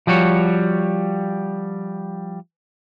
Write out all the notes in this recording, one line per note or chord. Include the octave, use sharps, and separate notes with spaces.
F3 G3 F#4 C#5